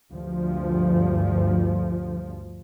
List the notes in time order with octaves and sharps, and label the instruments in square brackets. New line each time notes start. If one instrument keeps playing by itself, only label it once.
[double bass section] D2 G2 F3